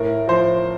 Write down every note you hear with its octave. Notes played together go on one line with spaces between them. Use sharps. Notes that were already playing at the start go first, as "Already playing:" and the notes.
Already playing: A2 A#4
F3 C5